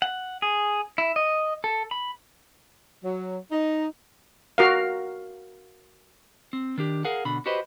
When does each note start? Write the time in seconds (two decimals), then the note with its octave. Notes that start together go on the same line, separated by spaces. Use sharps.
0.02 F#5
0.42 G#4
0.98 E4
1.16 D#5
1.64 A4
1.91 B5
3.03 F#3
3.51 D#4
4.58 F#4 A#4 F5
6.53 C4
6.78 D#3 D4 G4
7.05 G#4 A#4 F5 F#5
7.25 B2 D3 B5
7.46 F#4 G4 B4 C5 D#5